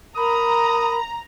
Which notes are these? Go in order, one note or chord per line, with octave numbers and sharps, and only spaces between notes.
A#4 A#5 B5 D#6